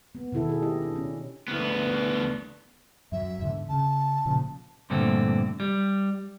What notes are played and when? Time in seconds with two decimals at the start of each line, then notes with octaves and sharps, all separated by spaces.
0.15 B3
0.32 B2 D#3 E4 A4
0.49 G#4 A4
0.62 E4 G4 D#5
0.82 D4
0.96 C#4
1.48 D2 B3
3.12 F#2 F#3 E5
3.39 E2 G#2 D3
3.69 C#3 A5
4.25 A#2 C#3 F3
4.90 G2 A#2 D3 A3 C4
5.60 G3